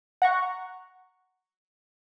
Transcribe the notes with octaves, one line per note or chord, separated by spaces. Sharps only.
F#5 A#5 C#6